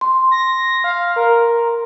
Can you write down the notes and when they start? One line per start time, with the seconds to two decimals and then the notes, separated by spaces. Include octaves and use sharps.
0.01 C6
0.31 A#6
0.84 F5
1.16 A#4